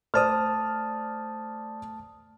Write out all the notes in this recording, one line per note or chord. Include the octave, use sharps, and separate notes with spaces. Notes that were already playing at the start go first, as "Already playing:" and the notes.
A3 C5 D5 A5 D#6 F6